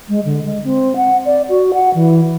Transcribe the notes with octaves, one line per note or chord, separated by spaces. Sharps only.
G#3
D3
G#3
C4
F#5
D5
F#4
F#5
E3